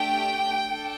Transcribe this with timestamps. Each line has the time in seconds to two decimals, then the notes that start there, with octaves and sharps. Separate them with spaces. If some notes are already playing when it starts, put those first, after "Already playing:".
Already playing: A3 D4 G4 G5
0.67 D4 A4